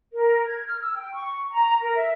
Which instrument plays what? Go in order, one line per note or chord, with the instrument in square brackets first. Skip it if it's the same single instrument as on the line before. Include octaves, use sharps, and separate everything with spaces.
[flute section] A#4
G#6
F6
E6
G5
C#6
A#5
A#4
E5